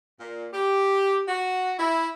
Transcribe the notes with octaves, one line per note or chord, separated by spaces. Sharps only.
A#2
G4
F#4
E4